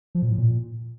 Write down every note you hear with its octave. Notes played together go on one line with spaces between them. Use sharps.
F3
A#2
A2
A#2